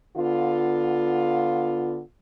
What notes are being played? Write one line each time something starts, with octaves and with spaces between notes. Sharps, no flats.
D3 B3 F4